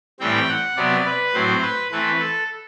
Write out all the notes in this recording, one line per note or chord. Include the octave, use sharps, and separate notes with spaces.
A2 E3 G3 C4 G5
F#5
C3 F#3 B3 D5
B4
A2 F#3 C4 C5
B4
E3 A3 C4 B4
A4